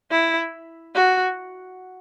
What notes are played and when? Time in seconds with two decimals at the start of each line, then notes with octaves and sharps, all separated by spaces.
0.11 E4
0.95 F#4